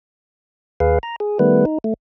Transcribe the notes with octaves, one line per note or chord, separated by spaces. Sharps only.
D#2 G#4 B4 F5
A#5
G#4
D#3 G3 A3 B3 B4
D#4
A3